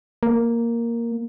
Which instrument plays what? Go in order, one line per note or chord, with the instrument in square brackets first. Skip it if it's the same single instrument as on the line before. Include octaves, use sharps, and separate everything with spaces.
[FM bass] A#3